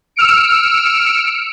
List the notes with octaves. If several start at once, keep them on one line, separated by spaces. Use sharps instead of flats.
E6 F6 C#7 D7